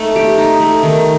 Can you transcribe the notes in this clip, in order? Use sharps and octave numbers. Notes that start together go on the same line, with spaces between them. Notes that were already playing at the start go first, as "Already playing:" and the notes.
Already playing: A3 D#4
G4
D#4
A3
D#3